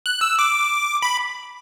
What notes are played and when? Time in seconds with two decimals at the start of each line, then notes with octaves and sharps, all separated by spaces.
0.06 F#6
0.21 E6
0.39 D6
1.02 B5